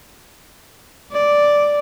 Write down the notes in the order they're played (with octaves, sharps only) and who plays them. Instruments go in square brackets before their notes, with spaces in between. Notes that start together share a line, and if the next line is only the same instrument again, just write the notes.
[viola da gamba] D5